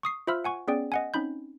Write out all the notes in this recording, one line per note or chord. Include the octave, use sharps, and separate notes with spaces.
C#6 D#6 C7
F4 C5 E5 B5 E6 F6
F#5 G#5 C#6
B3 C#4 G#4 D5 G5
D#5 F#5 G#5
C4 C#4 D#4 B5 G6